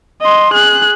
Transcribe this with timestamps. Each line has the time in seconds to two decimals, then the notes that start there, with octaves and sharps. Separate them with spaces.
0.22 D#5 C6
0.54 G#4 F#6